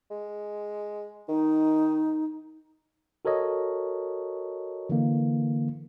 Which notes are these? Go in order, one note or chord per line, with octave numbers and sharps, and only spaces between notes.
G#3
D#3 D#4
F#4 A4 A#4 C#5 D#5
D3 E3 A#3